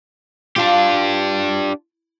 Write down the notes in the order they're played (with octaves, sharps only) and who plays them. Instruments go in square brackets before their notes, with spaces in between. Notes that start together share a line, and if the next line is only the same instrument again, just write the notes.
[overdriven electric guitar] D4 G4 [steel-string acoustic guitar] F4 F5 A5